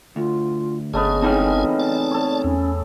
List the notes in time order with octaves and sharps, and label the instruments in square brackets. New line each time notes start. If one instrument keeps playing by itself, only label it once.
[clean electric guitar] D2 [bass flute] F4
[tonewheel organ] G1 G#4 [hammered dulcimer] C#3 A3 B3 [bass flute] D#5
[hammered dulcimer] C#3 E3 A4 [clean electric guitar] C4 D#4 G5
[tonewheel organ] D5 A5
[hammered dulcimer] A4 C#5
[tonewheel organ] E2 [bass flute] C#4